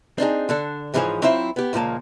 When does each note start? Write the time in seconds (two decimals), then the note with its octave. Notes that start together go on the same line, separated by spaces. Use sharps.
0.18 C4 D4 D#4 G#4
0.49 D3 D4 A4
0.94 G#2 E3 F3 G#4 C5 C#5
1.22 F#3 C4 E4 F4 C5 E5
1.56 B3 G4
1.73 C#2 A#2 F3 A#3 A5